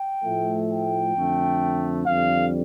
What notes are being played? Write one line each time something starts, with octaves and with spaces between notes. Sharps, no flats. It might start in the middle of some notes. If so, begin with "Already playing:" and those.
Already playing: G5
A2 F3 A3
G5
F2 D3 A3
F2 D3 G3 F5